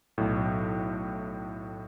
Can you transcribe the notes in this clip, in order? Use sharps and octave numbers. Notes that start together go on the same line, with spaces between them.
B1 A2